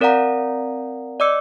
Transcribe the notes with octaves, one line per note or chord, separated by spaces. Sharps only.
C4 A#4 D5 F5 F#5 A#5
D5 D#5 D6 E6 C#7